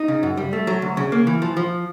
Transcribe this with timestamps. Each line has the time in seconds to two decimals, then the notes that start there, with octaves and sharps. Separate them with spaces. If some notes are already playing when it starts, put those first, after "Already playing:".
Already playing: D#4
0.08 C#3
0.23 F#2
0.37 G3
0.53 A3
0.67 F#3
0.82 D2
0.97 C#3
1.12 A#3
1.27 E3
1.42 F3
1.57 F3